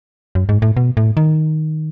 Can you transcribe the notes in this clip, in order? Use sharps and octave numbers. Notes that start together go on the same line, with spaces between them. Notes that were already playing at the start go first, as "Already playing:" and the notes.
F#2
G#2
A2
B2
A2
D#3